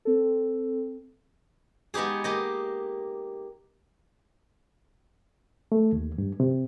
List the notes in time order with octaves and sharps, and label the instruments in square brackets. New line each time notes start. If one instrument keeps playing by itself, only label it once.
[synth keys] C4 A4
[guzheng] G#3 B3 D#4 G4 G#4
A#3 G4 D#5
[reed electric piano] A3
D#2
G2
C3